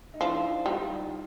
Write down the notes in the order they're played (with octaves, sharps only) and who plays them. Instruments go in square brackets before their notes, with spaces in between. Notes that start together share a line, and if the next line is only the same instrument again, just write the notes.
[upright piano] D#4
[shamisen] F3 [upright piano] D4 E4
[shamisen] G3 [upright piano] D#4 F4